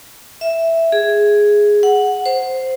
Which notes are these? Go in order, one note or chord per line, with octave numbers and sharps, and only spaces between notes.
E5
G#4
F#5
C5